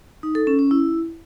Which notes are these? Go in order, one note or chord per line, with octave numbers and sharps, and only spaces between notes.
D#4
A4
C#4
C#4
E4